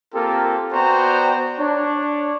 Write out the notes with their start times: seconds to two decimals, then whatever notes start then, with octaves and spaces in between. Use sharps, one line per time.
0.14 A#3 C4 F4 G4 A4 A#4
0.73 B3 F#4 C5 D5 G5 A#5
1.59 D4 C#5